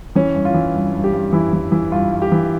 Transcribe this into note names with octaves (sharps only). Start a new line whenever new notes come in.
E3 C#4
G2
F4
E3
G2
G2
G4
G2
E3 E4
E3
E3
G2 F4
G2
G4
E3